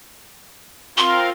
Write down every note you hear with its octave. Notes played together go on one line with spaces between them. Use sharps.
C4 F4 A#4 F5 C6